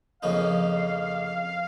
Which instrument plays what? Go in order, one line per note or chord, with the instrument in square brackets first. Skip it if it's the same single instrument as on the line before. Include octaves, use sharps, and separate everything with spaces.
[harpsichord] F2 C#3 F3 A#3 D#4 [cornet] F5